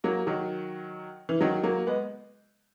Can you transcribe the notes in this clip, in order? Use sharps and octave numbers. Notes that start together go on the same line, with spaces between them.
F#3 A#3
D#3 F#3
E3
D#3 F#3
F#3 A#3
G#3 B3